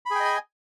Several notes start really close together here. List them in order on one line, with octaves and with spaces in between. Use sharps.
B5 G#4 G5 D#5 G#5